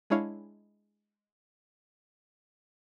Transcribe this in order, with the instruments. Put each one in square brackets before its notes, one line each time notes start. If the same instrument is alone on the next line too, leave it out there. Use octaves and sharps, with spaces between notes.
[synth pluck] G#3 D4 E4 C#5 F5